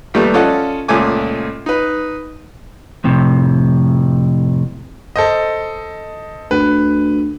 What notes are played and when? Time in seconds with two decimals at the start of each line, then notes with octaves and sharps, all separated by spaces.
0.14 D#2 G3 A3 B3
0.34 C#4 F4 A4 D5 D#5 F#5
0.88 C#2 A#2 A3 G#5 D6
1.66 D#4 B4
3.04 F2 A2 C3
5.16 A4 C5 D#5
6.51 D2 B4